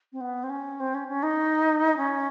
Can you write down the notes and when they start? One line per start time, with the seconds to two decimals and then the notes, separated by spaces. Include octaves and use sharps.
0.12 C4
0.20 B3
0.43 C4
0.49 C#4
0.79 C4
0.94 C#4
1.08 C#4
1.23 D#4
1.96 C#4